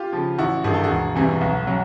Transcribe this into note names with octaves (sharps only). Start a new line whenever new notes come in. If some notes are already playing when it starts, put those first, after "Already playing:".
Already playing: F4 G4
C#3 F3
A1 E4 F#4
G2 D#3 G#4
A4
F#4 G#4
E1
E2 C3 E3 G3
B1
F#3